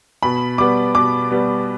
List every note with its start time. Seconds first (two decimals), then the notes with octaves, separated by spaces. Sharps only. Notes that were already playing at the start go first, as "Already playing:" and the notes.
0.23 B2 B5
0.58 G3 B3 D6
0.95 B2 D6
1.31 G3 B3